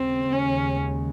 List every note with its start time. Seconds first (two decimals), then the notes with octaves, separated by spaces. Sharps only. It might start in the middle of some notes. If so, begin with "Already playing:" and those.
Already playing: D#2 C#3 G#3 C4
0.32 C#4